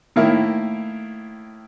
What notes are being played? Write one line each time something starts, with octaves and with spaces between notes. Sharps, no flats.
A2 D#3 A#3 E4